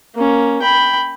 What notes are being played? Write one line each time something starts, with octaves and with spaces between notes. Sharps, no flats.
A#3 C#4
G5 B5